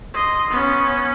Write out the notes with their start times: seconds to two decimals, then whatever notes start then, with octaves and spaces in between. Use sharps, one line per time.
0.14 D#5 C6
0.51 B3 C#4